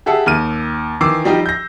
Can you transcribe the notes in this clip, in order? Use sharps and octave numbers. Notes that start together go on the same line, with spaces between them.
G4 G#4 E5 F#5 A5 E6
D#2 F6 D#7
D#3 E3 D6 E6 C7
F3 G3 D#4 G4
G6 A#6